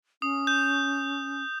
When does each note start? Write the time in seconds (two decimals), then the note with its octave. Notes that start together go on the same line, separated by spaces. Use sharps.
0.22 C#4 D#6
0.47 G6